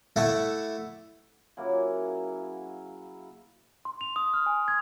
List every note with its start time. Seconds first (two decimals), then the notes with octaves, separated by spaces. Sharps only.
0.16 A3 E4 D5 F#5 B5
1.57 C#3 F#3 A#3 E4
3.85 C6
4.01 F7
4.16 D#6
4.34 F6
4.46 G#5
4.68 G#6